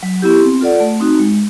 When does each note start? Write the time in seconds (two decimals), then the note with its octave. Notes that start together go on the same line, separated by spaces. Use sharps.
0.03 F#3
0.22 B3 E4 G4
0.42 C4
0.61 F4 A4 D5 F#5
0.80 A3
1.00 C4 D#4 F#4
1.19 G#3